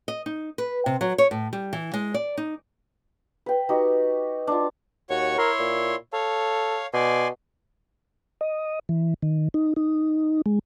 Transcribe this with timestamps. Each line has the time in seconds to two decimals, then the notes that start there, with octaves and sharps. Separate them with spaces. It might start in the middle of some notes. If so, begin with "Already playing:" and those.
0.08 D#5
0.26 D#4
0.58 B4
0.86 C3
1.01 F#3
1.18 C#5
1.31 A2
1.53 G3
1.73 E3
1.94 G#3
2.14 D5
2.37 D#4
3.46 B4 G5
3.69 D#4 F#4 G4
4.47 D4 F4
5.10 D#2 F#4 C#5 C#6
5.38 E4 A#4 C#5 C6
5.59 A#2
6.13 A4 C#5 F5
6.94 B2 D5 G#5 C6
8.41 D#5
8.89 E3
9.23 D#3
9.54 D#4
9.76 D#4
10.46 G#3